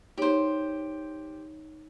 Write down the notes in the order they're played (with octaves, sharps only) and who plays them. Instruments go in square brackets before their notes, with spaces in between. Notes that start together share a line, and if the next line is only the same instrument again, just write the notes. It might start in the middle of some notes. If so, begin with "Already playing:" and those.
[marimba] D#4 C#5 [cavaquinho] G4 C5